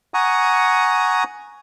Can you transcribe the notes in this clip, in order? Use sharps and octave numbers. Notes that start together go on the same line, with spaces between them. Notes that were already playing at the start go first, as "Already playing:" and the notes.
F#5 G#5 A#5 C#6 D#6